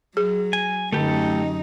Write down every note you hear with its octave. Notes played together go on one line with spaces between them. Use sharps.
F#3 G#4
G#5
F#2 D3 A3 D#4 G4 A4